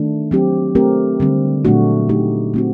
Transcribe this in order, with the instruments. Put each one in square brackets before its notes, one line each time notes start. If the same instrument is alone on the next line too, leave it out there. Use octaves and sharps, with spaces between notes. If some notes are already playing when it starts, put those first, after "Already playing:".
Already playing: [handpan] D#3 A3 D4
F#3 C4 G4
A3 C4 G4 A#4
D3 G3 C4
A#2 F#3 A3 D4 F#4
D3 A3 D#4 G4
A3 C4 F#4